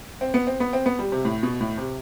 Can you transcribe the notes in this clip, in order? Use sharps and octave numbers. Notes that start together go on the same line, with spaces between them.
C4
B3
C4
B3
C4
B3
G3
C3
A2
B2
A2
C3